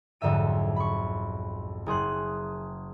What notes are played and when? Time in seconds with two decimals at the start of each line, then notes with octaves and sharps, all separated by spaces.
0.21 B1 F2 G#2 D3 E5 D#7
0.76 B5 C#6
1.86 F#1 G#4 C6 F#6